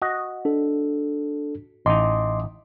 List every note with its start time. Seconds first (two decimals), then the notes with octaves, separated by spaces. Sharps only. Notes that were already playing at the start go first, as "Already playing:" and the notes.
0.02 F#4 D#5
0.45 D4 A4
1.86 A1 D#4 D#5 C6 D6